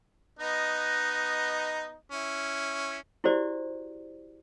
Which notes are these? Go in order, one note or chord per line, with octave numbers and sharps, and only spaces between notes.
B3 D#4 D#5
C#4 E4
E4 F#4 G4 C5 D5